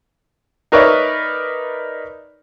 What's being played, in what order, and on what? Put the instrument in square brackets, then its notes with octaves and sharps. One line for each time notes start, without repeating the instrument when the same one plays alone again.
[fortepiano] D#4 A#4 B4 C#5 D5 E5